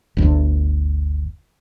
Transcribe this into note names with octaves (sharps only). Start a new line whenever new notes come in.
G1 D2